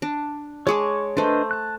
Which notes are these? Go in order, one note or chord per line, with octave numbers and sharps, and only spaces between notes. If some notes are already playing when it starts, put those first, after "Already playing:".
D4
G#3 G#4 C#5 A5 C#6 D6
A3 D4 B4 C5 D#5
A5 F#6